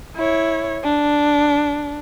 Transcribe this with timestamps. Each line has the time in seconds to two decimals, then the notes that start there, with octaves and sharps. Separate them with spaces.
0.16 E4 C#5
0.84 D4